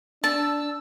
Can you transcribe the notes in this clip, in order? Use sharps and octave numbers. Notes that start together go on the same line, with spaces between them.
D4 A5 E6